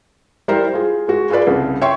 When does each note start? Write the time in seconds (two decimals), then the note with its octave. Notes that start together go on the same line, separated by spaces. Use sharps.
0.48 G3 E4 A#4 C5
0.73 F4 G#4
1.08 G#3 F#4
1.30 F4 G#4 A4 B4 D5
1.47 C2 C#3
1.81 C#5 E5 G5 C6 C#6